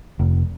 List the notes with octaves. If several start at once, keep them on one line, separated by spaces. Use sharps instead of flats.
F1